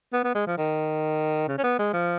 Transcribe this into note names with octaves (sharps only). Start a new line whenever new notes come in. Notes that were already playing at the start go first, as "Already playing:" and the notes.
B3
B3
G#3
F3
D#3
C#3
C#4
B3
G#3
F3